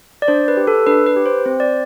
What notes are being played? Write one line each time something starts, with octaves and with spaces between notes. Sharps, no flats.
D5
D4 C5
B4
G4
A4
D4 B4
B4
G4
C5
C4 C5
D5